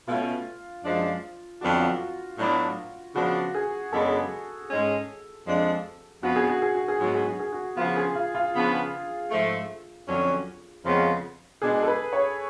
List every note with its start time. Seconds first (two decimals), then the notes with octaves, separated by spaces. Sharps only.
0.08 B2 A3 C#4 F4
0.84 F#2 F3 G#3 D4
1.61 F2 D3 F#3 B3 D4 F#4
1.75 F4
1.89 F#4
2.38 A2 F#3 B3 D4
3.15 C#3 F3 B3 D4 F#4
3.55 G#4
3.92 F#2 C#3 G#3 B3 D4 A4
4.70 G#2 G#3 C#4
5.46 F2 F3 G#3 D4
6.23 F2 F3 B3 F#4
6.36 G#4
6.49 F#4
6.62 G#4
6.75 F#4
6.88 G#4
6.99 G#2 F#3 B3 F#4
7.14 G#4
7.27 F#4
7.40 G#4
7.53 F#4
7.77 C#3 F3 B3 F4
7.96 G#4
8.15 F4
8.35 F4
8.54 C#3 F3 B3 D4
9.31 G#2 F3 A3
10.08 F2 D3 F#3 C#4
10.84 F2 C#3 F3 G#3 B3
11.61 B2 G#3 D4 G#4
11.83 A4
11.88 B4
12.13 C#5